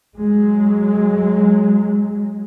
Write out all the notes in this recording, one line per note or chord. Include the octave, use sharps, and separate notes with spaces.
F#3 G#3